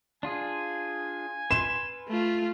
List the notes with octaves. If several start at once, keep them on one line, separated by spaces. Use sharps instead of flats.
D4 F4 G#4 G#5
B4 C6 E7
A3 F4